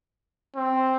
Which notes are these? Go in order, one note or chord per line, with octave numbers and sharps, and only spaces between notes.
C4